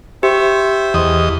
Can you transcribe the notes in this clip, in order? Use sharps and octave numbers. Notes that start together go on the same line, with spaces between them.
G4 C5 E5
E2 D#5